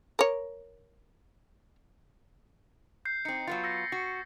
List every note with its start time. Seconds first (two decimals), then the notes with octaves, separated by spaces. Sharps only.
0.19 A#4 C#5
3.05 G6 C7
3.25 C4 D#4 C7 C#7
3.47 F#3 B3 F4 A6
3.63 E6 G6 A#6
3.92 F#4